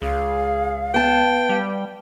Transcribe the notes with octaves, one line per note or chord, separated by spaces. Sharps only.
C#2 G#4 F5
B3 G5 A5
G3